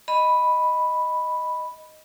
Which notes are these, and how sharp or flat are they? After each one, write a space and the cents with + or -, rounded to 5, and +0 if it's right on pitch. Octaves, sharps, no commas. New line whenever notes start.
D#5 +0 B5 +0